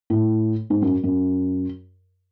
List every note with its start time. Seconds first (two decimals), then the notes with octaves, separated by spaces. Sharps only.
0.10 A2
0.70 G#2
0.82 F#2
1.04 F#2